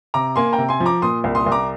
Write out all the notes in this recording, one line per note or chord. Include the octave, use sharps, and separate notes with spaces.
C3 A#5 D6
A#3 G#5 C6
G5 A#5
C3
G#5 C6
F3
A#5 D6
A#2 C6 D#6
C2
C6 D#6
C2
A#5 D6